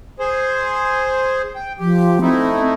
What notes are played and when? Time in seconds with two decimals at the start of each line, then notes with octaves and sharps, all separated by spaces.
0.19 G#4 C5
1.55 G5
1.79 F3 G4
2.22 A3 C4 D#4 E4